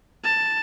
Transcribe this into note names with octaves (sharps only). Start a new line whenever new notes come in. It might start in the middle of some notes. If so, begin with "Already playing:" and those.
A5